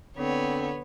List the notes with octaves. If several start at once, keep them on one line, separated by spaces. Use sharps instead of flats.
D3 B3 C4 C#5